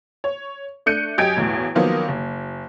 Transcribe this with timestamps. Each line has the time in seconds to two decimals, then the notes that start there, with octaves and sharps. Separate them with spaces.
0.24 C#5
0.86 A3 D4 F#6 G6 C#7 D#7
1.18 F#2 G4 D#5 G#5 G#6 D7
1.36 B1 E2 A2
1.75 D#3 F3 F#3 A#3 B3 D#4
2.08 F#1